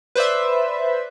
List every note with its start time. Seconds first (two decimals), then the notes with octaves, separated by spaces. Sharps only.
0.15 B4 C5 D5 E5